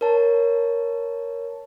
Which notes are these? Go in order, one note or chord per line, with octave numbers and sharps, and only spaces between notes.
A#4 C#5 A5